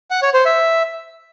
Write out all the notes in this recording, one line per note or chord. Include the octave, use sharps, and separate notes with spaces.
F#5
C#5
C5
E5